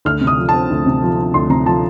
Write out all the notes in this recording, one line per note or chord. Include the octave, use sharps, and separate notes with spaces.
D2 F6
C3
D#6
F3
C4 A5
D2
C3
F3
C4
D2 C6
C3 A#5
F3 A5